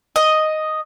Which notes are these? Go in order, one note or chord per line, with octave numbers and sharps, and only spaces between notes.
D#5